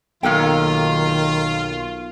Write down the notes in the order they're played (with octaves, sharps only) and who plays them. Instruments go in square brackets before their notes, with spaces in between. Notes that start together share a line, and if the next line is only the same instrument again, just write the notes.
[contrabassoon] B1 [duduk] D#3 [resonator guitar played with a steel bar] A#3 A4 G5 [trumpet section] F4